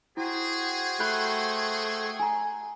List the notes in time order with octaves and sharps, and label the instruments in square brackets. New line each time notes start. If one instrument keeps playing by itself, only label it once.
[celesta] E4 [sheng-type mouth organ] F#4 C5 G5 [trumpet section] G#4
[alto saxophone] A3 [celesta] B5 F#6 G6
[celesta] G#5 A#5